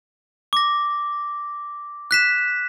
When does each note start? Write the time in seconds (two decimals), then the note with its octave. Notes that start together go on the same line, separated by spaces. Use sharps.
0.53 D6 A#6
2.11 F#6 B6 E7